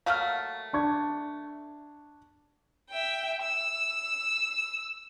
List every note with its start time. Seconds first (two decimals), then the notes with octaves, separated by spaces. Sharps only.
0.06 F#3 A3 A#3 F5 F6
0.73 D4 C#6 G#6
2.90 E5 G5
3.42 E6